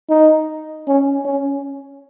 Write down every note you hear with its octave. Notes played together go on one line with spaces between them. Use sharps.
D#4
C#4
C#4